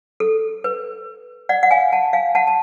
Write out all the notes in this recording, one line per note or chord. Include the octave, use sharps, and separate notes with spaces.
A4
B4
D5 F#5
F#5
F5 G#5
F#5 A5
F5 G#5
F#5 A5
A5